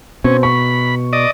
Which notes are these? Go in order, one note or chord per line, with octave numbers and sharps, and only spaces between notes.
B2 C4 C#4
B5 C#6
D5 D#5